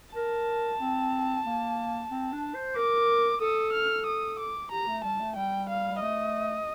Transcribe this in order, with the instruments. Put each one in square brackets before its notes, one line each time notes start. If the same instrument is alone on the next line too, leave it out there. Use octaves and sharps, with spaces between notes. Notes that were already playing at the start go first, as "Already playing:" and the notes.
[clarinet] A#4 [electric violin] A5
[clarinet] C4
A#3
C4
D4
C5
[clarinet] A#4 [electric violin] D6
[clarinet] A4 [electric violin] D#6
[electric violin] F6
D#6
D6
[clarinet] G4 [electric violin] A#5
[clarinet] A3
[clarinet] G3 [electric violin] A5
[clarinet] A3
[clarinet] G3 [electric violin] G5
[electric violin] F5
[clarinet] G3
[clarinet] A3 [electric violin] D#5